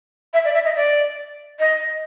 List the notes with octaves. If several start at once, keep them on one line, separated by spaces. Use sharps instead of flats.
E5
D5
E5
D#5
D5
D#5